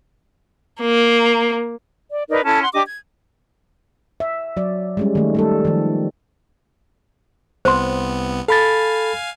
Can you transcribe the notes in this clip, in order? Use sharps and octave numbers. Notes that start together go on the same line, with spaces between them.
A#3
D5
D#4 A#4 B4 D5
C#4 E4 A4 A5
F#5 C6
D4 G4 D#5 D6
G#6
E5
F#3 D5
G3 G#3 C#4
D#3 A3
G3 A3 A4
D#3 F3
C2 B3 C5 C6
A4 F5 G#5 B5 A6